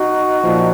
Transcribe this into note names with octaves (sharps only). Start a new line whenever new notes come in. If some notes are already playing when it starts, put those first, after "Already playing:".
Already playing: D#4 F#4
A#2 F3